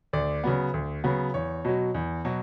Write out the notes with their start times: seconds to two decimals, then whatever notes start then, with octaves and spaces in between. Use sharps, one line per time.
0.13 D2 D5
0.44 C#3 F#3 B3
0.74 D2
1.04 C#3 F#3 B3
1.34 E2 C#5
1.65 B2 F#3
1.94 E2
2.25 B2 F#3